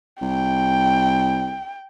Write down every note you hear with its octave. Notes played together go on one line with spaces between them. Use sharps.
C2 G5